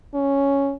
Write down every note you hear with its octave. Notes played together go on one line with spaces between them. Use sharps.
C#4